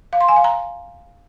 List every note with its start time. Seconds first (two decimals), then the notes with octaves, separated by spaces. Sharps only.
0.13 F5
0.21 C6
0.29 G#5
0.36 F5
0.44 A#5